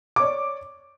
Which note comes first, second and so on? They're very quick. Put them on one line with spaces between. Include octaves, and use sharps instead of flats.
D6 C#5 D5